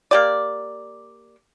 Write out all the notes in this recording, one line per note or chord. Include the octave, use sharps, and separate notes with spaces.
A#3 G4 D5